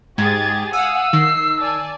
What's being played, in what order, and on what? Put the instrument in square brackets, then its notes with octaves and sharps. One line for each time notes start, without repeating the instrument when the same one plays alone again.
[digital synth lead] G#2 [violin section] G4 G#4 A6 [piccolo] G#6
[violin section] F5 F#5 D#6 [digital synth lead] G#5 [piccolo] E6
[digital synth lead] D#3 [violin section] C7
[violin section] D5 G#5 A5